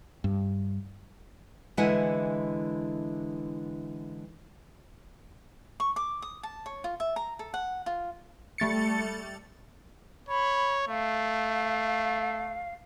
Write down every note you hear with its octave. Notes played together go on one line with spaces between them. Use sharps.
G2
D3 E3 G#3 E4 F#5 G#5
C#6
D6
D#6
A5
C#5
F4
E5
A#5
A4
F#5
F4
G3 A3 A6 C#7
C#5 B5
A3 F5